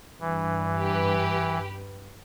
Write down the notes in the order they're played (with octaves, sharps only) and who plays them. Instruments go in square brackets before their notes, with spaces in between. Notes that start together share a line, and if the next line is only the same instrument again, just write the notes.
[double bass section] G2 [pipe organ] E3
[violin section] G4 B4